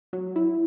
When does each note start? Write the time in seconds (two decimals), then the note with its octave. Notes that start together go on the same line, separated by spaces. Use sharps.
0.13 F#3
0.36 E4